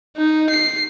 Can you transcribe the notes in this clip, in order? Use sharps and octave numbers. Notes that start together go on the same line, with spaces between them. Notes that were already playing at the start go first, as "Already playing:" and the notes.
D#4
C7